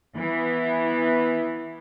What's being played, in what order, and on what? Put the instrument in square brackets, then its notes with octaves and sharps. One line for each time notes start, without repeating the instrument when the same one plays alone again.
[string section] E3 B3